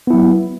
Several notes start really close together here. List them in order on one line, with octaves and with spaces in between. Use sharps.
B3 E4 F#3